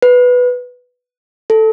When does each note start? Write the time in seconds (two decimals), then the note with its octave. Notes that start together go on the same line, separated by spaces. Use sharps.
0.02 B4
1.50 A4